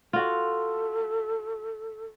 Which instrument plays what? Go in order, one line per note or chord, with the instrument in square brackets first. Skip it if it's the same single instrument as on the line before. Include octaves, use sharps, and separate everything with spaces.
[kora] F4 F#4 [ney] A4